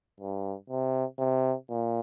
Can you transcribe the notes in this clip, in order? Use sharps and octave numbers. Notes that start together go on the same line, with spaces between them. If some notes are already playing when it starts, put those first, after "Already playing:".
G2
C3
C3
A#2